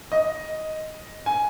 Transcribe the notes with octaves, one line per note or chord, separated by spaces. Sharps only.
D#5
G#5